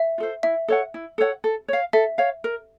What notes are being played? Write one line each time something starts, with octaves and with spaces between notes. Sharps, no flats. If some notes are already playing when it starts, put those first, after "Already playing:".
Already playing: E5
F4 A4 C5
E4 E5
A4 C#5 F#5
E4
A4 C#5 F#5
A4
C#5 F5
A4 E5
C#5 F5
A#4